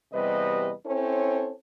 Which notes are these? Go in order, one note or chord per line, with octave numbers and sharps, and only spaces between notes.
E2 C3 G3 B4 D#5
C4 C#4 E4 A4 C5 C#5